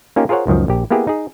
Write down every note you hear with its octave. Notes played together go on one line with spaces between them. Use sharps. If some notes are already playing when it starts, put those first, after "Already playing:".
A#3 C#4 D#4 F4 G4
F4 G#4 A#4 C5 C#5 F#5
C#2 F#2 D#3 F3
A#1 G4
A#3 B3 E4 G4 G#4
D#4 G#4